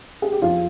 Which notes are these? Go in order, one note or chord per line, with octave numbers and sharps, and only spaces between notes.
G#4
G4
F2 F3 F4